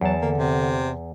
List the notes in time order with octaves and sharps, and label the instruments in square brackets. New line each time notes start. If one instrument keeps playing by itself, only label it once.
[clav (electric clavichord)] E2 A5 [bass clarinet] F#3
[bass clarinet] D3 [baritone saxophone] A#3
[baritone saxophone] C3